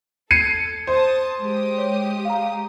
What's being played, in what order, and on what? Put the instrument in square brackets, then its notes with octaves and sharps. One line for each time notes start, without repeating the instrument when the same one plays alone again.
[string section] A4 [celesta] G#6 [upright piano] C7 C#7 D#7
[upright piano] C5 [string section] A5 D#6
[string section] G#3 G4 D#6
[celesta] C#5
F5 A#5